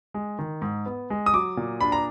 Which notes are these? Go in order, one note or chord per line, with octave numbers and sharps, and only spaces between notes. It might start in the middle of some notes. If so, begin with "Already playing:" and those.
G#3
D#3
G#2
B3
G#3
D#6
F#3 D6
A#2
D4 B5
A#5